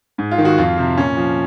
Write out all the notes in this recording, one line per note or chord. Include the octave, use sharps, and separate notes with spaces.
G#2
F4
D#3
F#4
F2 F4
C3 F3
A#2 C#4
F3